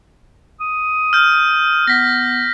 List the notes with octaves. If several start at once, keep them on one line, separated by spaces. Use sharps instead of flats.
D#6
F6 G6
B3 A#6 B6